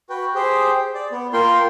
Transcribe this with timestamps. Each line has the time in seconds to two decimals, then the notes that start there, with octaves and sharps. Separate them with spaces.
0.10 F#4 B4 G5
0.35 G4 G#4 C5 G5
0.95 D5
1.12 B3
1.33 A#3 F4 A#4 G5 C6